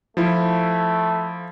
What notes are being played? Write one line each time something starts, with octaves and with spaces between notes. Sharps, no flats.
F3 A3 E4